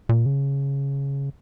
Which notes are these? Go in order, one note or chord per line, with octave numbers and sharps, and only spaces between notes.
A#2
C#3